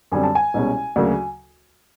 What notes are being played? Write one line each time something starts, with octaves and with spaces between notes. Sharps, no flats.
F#2 D3 G3 C4 G#5
A5
G#5
C2 B2 G#3 C#4
D2 C#3 F#3 A#3